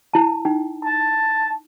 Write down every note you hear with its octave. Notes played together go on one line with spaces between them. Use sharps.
E4 A5
D#4 G5
A5